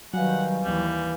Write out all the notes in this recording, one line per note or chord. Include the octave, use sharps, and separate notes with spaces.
D#3 F#3 G3 B4 F5 F#5 G#5
D#2 E3 G3